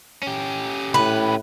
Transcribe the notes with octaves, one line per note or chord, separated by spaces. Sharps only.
C#4 G4
A2 B4